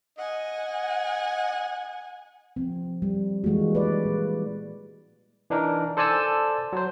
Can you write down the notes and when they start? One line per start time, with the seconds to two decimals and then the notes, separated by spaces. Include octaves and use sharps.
0.18 D#5 F#5 G#5
2.56 F3 C4
3.02 G3
3.44 E3 G#3 A#3 F#4
3.75 B4 D5
4.05 A#2
5.50 E3 D4 D#4 A#4
5.97 A4 C5 D5 G#5 A5 E6
6.73 F#3 C5